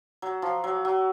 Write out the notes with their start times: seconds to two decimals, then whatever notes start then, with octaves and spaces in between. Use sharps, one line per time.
0.22 F#3
0.42 F3
0.64 F#3
0.85 F#3